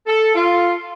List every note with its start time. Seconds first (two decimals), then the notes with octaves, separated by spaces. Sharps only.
0.06 A4
0.33 F4